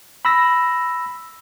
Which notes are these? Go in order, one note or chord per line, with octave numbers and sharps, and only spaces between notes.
B5 E6 A#6